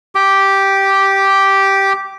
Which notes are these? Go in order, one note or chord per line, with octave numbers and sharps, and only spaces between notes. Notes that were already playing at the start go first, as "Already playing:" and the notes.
G4 D6